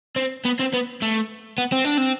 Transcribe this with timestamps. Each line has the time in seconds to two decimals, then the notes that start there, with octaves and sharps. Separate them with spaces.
0.16 C4
0.45 B3
0.59 C4
0.73 B3
1.02 A3
1.58 B3
1.72 C4
1.85 D4
1.98 C4